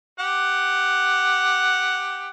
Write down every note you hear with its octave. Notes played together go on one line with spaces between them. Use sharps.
G4 F#5